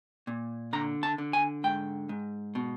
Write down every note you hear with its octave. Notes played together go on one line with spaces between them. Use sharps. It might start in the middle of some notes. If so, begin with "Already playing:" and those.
A#2
D3 A#5
A5
D3
G#5
G#2 G5
G#2
B2